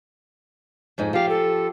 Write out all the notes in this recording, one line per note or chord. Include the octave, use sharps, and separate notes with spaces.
F2 G#2 D#4
F3 G4 F5
A4